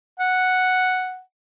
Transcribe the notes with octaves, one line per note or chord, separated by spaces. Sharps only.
F#5